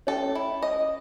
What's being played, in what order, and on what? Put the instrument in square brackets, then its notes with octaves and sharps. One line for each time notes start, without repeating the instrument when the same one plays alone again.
[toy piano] C#4 C#5 [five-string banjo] A4
[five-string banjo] E4
D#5